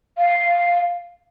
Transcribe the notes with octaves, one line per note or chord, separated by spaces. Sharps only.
F5